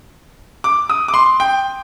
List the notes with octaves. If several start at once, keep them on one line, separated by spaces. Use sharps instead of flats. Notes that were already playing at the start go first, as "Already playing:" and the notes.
D6
D#6
D6
C6
G5